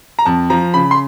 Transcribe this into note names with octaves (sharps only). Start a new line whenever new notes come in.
A#5
F2 A5
F3 A#5
C#3 B5
C6